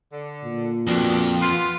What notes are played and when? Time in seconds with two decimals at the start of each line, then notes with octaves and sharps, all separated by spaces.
0.11 D3
0.44 A#2
0.87 F2 B2 D4
1.41 B3 F4